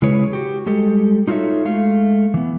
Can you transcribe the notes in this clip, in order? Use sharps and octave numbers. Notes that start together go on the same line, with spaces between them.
C#3 G#3 E4 G#4 B4 C#5
F#4 G4
G3 G#3 G4 A4
D#4 F4 F#4 A4 C#5 E5
G#3 A3 F5
E3 B3